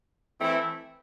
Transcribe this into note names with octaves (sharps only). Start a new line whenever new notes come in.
E3 A3 C4 E4